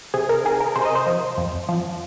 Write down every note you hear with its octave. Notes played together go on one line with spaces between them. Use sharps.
C3 G#4
A#4
D#3 G#4
A#4
C3 C5
D#5
C5
F3
F2
F3